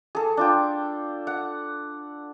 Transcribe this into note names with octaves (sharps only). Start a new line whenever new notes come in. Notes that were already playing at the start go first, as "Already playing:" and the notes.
G#4 A4
D4 F4 G5
F#5